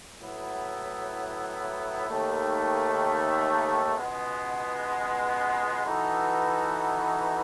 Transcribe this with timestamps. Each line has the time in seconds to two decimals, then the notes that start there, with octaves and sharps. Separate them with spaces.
0.20 A2 F#3 B3 E4
2.09 D#2 D#3 A3
3.97 C#2 B2 G#3 B3
5.85 E3 B3 D#4 F#4 A4